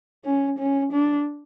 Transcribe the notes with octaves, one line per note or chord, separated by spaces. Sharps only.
C#4
C#4
D4